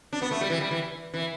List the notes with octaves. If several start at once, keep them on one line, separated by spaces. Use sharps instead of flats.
D4
B3
A3
G3
E3
G3
E3
E3